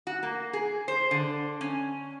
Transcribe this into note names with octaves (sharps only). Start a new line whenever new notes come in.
F#4
A#3
G#4
C5
D3
C#4